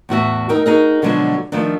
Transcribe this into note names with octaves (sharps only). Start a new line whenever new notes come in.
E2 A2 F#4 E5
D#4 A#4 G5
D#4 F#4 G#4 A#4 D#5
B2 D3 F3 F#3 G#3 D4
D#3 F3 A3 D4